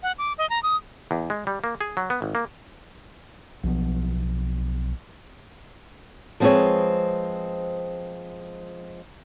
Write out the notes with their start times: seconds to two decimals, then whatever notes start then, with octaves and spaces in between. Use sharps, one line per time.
0.03 F#5
0.18 D6
0.38 D#5
0.50 A#5
0.63 D#6
1.11 E2
1.30 G#3
1.47 G3
1.64 A#3
1.81 G#4
1.97 F#3
2.10 B3
2.22 G#1
2.35 A#3
3.63 B1 F3 B3
6.40 F3 G#3 C4 G#4 B4 C#5